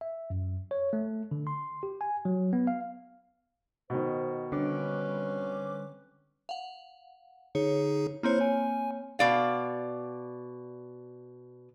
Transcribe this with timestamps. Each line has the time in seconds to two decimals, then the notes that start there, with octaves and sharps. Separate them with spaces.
0.01 E5
0.30 F#2
0.71 C#5
0.93 A3
1.31 D3
1.47 C6
1.83 G4
2.01 G#5
2.25 F#3
2.53 B3
2.67 F5
3.90 B2 D#3 C5
4.52 D3 G3 C4 C#4 B4 D6
6.49 F5 F#5
7.55 D3 D#4 G#4 C#5
8.23 A#3 C4 E4 C5 C#5
8.41 G#5
9.19 B2 D5 F5